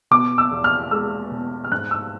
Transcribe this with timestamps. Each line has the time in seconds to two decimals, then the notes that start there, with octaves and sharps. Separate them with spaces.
0.11 B2 D6
0.38 E6
0.51 E2
0.64 F6
0.91 G#3 E6
1.31 B2
1.64 F6
1.72 G#2 F#6
1.91 E6